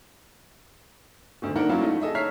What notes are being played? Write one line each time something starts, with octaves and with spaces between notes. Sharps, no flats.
G#1 D2
A#3 D4 D#4 A#4 F#5
F#3 A#3 C#4 E4 F4
A3 D#4 D#5
G#4 A4 D#5 E5
C#5 E5 A#5 F6 B6 C7